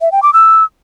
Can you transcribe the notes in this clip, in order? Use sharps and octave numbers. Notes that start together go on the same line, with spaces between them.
E5
G5
D6
E6